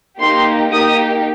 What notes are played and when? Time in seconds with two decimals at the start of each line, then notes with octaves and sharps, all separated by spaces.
0.20 A#3 D#4 G4 C6
0.72 A#3 D#4 G4 D#6